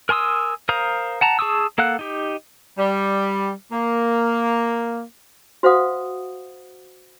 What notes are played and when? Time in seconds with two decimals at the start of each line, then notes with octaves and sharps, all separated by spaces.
0.09 A#4 G#5 C6 D#6 E6
0.69 A#4 C5 F5 A#5 D#6
1.21 F#5 A5 A#5
1.39 G#4 A5 C#6 D#6 E6
1.78 A#3 A4 F5 F#5 F#6
1.99 D#4 G4
2.78 G3
3.71 A#3
5.63 F#4 C5 F5 F#5 D#6